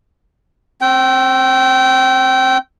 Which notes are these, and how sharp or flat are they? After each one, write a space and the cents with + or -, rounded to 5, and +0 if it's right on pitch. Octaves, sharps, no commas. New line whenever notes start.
C4 +20 G5 -25